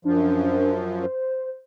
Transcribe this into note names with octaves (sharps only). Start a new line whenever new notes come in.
F#2 F3 D4
C5